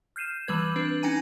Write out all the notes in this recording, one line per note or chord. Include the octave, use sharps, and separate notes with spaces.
F6 G6 C7 D#7 E7
E3 G3 B4 G#6
C4 D4 B4
C#4 D#4 G5 G#5 A#5 D#7